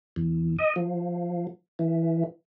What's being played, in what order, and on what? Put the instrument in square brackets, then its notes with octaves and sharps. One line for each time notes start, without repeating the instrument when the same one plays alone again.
[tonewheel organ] E2
D#5
F3
E3